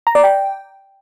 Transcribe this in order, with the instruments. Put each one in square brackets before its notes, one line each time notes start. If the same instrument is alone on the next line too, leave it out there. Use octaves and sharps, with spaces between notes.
[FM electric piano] A#5
D5
G5